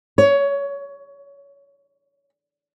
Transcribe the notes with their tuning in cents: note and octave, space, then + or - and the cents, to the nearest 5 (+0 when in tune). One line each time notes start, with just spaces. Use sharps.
C#5 +20